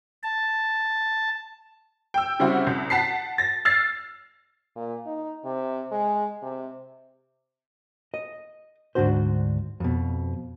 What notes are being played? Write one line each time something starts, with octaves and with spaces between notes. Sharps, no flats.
A5
G5 E6
C#3 G3 C4 E4 F#4
C2
F#5 A5 B6 C7
A6 A#6
E6 F6 G#6 A6 C7
A#2
D#4
C3
G#3
C3
D#5
D2 G#2 B2 D4 F#4 C5
F2 B2